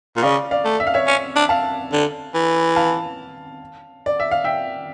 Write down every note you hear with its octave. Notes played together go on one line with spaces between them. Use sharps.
A#2
C#3 D5 F5
D5 F5
A3
E5
F5
C#5 E5
C#4
D4
F5 A5
D3
E3
F5 A5
D5
E5
F5
E5 G5